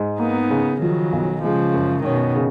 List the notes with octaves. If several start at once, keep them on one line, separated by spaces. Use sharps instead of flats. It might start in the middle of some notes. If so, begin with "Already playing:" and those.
Already playing: G#2
A#3 B3 D#4
C#3
D#3 F3 F#3
B1
C#3 F3 G#3
F#2
B2 D#3 C#4
C#3